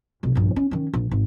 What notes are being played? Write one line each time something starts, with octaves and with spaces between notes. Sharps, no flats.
F1 B1
A#1 G2
C#4
D#3 C#4
A#1
G#1